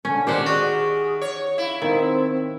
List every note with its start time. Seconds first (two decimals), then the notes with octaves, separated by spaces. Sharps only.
0.05 D3 C#4
0.27 D#3 G4 C5 D5 F#5
0.46 F#4 G#4
1.21 C#5
1.58 E4 F5
1.82 D#3 C4